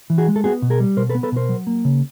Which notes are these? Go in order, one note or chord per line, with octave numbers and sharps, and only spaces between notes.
E3
F#4 G#4
G#3
A4
B3 F#4 G#4
B2
G#4 A#4
G3
B2 A#4 C5
A4 B4
B3
A4 B4
B2 A#4 C5
F#3
A#3
C#3